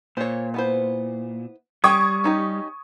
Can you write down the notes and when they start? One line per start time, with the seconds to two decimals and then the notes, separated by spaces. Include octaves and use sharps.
0.17 A#2 C5 C#5
0.54 B3 E4 C5
1.84 G3 C#4 G5 G#5 C#6 D#6 G#6
2.24 C#4 D#4 G4